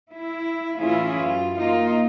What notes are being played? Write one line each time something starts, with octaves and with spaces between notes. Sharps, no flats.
E4
A2 E3 C#4 E4 F4 G#4
F#2 F4
A#3 D#4 F4